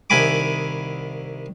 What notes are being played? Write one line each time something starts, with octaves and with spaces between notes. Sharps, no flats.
C2 D#3 E4 G#5 B5 D6